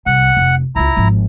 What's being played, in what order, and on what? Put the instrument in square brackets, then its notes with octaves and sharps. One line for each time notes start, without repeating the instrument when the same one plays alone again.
[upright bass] C2 [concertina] F#5
[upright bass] F1
[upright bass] C#2 F4 [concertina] E4 A#5
[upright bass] G#1 F3